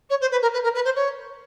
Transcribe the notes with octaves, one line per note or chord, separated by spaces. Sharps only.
C#5
C5
B4
A#4
B4
A#4
B4
C5
C#5